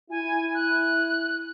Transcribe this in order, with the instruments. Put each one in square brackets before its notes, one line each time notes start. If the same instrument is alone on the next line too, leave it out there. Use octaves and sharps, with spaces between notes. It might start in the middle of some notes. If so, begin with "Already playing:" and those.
[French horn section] E4 [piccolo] G#5
[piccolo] F#6